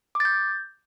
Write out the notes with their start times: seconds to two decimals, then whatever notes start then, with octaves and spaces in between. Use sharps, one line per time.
0.15 D6
0.20 A6
0.25 G6